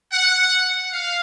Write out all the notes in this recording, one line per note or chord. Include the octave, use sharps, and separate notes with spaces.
F#5
F5